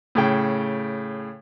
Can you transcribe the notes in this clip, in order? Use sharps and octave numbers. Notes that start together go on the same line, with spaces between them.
A2 C#3 G5